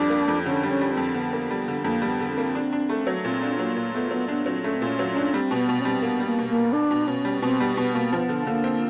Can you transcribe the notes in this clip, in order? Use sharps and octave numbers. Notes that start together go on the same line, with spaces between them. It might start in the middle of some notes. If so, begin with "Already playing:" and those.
Already playing: F2 G3 D4
A#3
F2
D3 C#4
G3
C#4
G3
C4
F2
D3 B3
A#3
G3
D3
F2 A#3
G3
B3
D3
C4
A#3
D4
D4
A3
F#3
A#2 C4
D4
F#3 A#3
A#2
A3 B3
F#3 B3
B3 D4
F#3 C4
A3 C#4
C4
A#2
C#4
F#3
C#4
D4
G3 C4
B2
B3
B2
C#4
G3 C4
A#3 B3
G3
A#3
B2
A#3
B2
A#3 D4
B2
B2 C#4
G3
B2 C4
G3 B3
B2 B3
B2 A#3
F3 B3 C4
D3
D3 A#3
C4